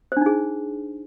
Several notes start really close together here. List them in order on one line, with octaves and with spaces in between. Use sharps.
C5 D4 D#4 G#4